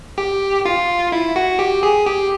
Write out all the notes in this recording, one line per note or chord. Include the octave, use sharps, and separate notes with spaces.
G4
F4
E4
F#4
G4
G#4
G4